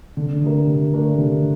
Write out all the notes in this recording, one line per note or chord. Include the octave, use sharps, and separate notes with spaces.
D3
A3 D4 G4 A#4
D3
A3 D4 G4 A#4
D3